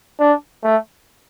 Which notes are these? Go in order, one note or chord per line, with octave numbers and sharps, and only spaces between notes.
D4
A3